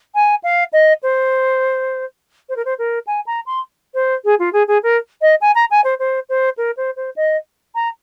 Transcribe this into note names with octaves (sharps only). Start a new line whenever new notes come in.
G#5
F5
D#5
C5
C5
A#4
C5
A#4
G#5
A#5
C6
C5
G#4
F4
G#4
G#4
A#4
D#5
G#5
A#5
G#5
C5
C5
C5
A#4
C5
C5
D#5
A#5